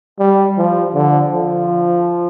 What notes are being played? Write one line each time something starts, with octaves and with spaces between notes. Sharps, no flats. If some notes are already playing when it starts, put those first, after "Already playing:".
G3
F3
D3
F3